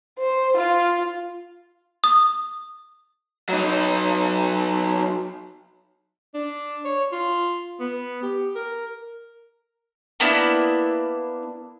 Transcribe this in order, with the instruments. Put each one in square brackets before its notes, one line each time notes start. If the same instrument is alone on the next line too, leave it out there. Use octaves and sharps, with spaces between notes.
[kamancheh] C5
F4
[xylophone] D#6
[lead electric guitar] F#3 D#4
[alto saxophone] D4
C#5
F4
B3
G4
A#4
[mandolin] A#3 B3 D4 E4